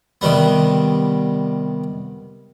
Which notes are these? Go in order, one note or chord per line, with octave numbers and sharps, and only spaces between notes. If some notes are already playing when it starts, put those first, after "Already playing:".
C3 D#3 G3 B3